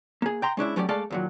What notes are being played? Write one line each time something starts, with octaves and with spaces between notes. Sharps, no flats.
A#3 G#4
G5 A#5 C6
G#3 C#4 D4 E4
F#3 A3 B3 C#4 G4 D5
G#3 A3 A4 D5 F5 A5
D#2 A#2 F#3